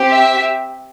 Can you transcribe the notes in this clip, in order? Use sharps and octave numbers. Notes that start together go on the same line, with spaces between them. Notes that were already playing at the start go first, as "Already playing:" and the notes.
Already playing: C4 G4
E5